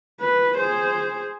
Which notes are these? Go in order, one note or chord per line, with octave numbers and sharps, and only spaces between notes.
B4
G#4 C5